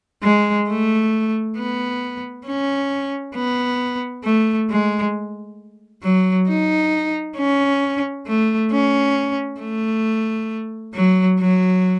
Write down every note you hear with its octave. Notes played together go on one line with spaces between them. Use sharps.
G#3
A3
B3
C#4
B3
A3
G#3
F#3
D#4
C#4
A3
C#4
A3
F#3
F#3